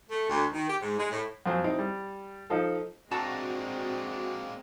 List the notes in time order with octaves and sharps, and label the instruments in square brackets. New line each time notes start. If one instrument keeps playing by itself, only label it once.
[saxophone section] A3
D2
D#3
G4
G#2
G#3
A2
[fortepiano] F2 F#3 C4 C5 G#5
C4 D#4 E4
G3
F3 D#4 A4 C5
[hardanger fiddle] G#3 C4 [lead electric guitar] A#3 D4 [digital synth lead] F#4 [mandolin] A5 A#5 E6